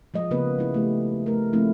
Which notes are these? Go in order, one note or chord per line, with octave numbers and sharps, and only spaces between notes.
F3 G#3 D#5
C#3 A#3 B3 B4
G#3 E4
A3 G4
A3 A#4
F3 A3 A#3 C4 E4